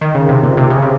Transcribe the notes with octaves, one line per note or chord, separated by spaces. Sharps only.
D#3
C#3
C3
A#2
C3
C#3
C3